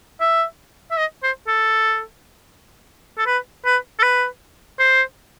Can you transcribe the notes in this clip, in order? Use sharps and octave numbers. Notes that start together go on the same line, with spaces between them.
E5
E5
D#5
C5
A4
A4
B4
B4
A4
B4
C5